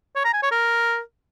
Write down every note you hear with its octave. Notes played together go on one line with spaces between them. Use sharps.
C#5
A#5
G#5
C#5
A#4